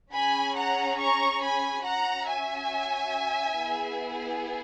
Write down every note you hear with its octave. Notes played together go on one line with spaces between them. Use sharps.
C#4 G#4 G#5 B5
F#5 A#5
A#5 C#6
G#5 B5
C#4 F#4 F#5 A#5
E5 G#5
B3 E4 G#4